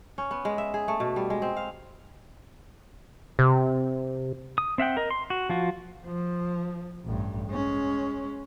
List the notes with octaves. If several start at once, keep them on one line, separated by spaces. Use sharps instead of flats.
C#4
B3
G#3
E5
G#4
A3
B2
G3
G#3
C4
F5
C3
D#6
C4 E5 F#5 G5
A#4 D#5
C6
F#4
F3 F4 F#4
F3
A1 G2
G#3 C#4